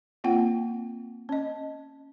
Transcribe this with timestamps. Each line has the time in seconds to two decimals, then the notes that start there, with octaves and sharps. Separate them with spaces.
0.24 A#3 C4 F4 F#5 G5
1.29 C#4 D#5